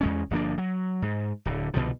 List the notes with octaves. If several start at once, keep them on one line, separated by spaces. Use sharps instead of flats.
E2 G#3 C#4
G1 F3 A#3 D4
F#3
G#2
D1 D3
C2 B2 D3 F3